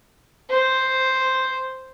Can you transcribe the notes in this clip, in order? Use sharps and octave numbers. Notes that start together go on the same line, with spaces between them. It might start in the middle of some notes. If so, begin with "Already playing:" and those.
C5